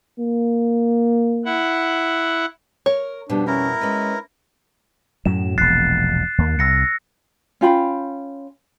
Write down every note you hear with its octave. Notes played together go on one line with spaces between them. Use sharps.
A#3
E4 F#5
A#4 C#5
F2 B2 G3 D4
C#4 E4 A#4
G#3 C#4 B4
F#2 A2 F#3 E7
E1 A#1 F#6 A6 C7
D#2 A#3
C2 E6 A#6 C#7
C#4 F4 G5 B5